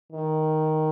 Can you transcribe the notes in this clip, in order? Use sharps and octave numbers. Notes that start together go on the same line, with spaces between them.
D#3